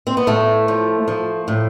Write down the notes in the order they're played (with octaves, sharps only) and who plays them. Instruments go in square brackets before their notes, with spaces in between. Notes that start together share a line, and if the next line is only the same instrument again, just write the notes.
[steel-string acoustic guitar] C4
B3
A2 A3
F3
F3
A2